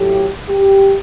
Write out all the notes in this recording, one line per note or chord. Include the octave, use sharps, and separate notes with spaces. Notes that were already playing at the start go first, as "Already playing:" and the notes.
Already playing: A2 F#3 A3 G4
G4